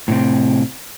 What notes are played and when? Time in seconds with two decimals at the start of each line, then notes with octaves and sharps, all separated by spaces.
0.08 A2 C3 C4